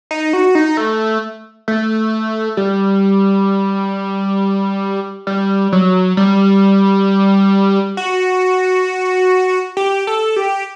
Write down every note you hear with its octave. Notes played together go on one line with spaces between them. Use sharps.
D#4
F#4
D#4
A3
A3
G3
G3
F#3
G3
F#4
G4
A4
G4